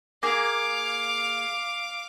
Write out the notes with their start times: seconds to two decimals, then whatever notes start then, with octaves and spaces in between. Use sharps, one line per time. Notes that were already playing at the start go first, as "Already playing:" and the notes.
0.23 A#3 G#4 F5 D6